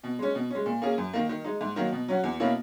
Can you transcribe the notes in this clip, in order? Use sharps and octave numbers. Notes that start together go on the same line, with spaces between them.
B2
G#3 C#4
B2
G#3 C#4
A#2
A#3 C#4 G#4
F#2
D#3 A#3
D#3
G#3 D#4
G#2
D#3 F#3 A#3
B2
F#3 C#4 F#4
E2
B2 A#3 C#4 E4